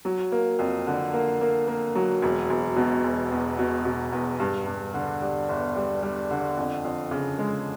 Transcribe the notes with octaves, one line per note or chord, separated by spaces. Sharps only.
F#3
A#3
F2
D3
A#3
A#3
A#3
F#3
E1
E1
B2
E1
E2
B2
B2
E2
G2
G2
D3
G3
G1
G3
G3
D3
F2
F2
C#3
G#3